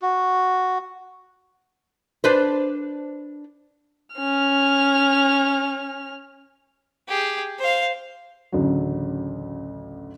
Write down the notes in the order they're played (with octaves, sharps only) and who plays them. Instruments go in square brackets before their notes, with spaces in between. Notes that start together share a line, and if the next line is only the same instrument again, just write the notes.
[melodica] F#4
[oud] D4 B4 C5
[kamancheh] C#4 F6
[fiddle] G4 G#4
C5 F5
[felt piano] A1 D2 C#3 F#3